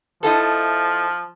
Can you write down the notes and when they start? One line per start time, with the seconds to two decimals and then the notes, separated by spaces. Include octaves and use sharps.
0.23 F3 D#4 E4 A4